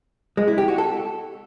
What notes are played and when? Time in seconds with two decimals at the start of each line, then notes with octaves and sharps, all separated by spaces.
0.37 G#3
0.48 E4
0.58 G4
0.68 F#4
0.78 A4